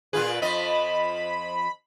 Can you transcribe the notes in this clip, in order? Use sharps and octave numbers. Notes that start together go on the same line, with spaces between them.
A#2 F4 G#4 B4
F2 F3 D#5 B5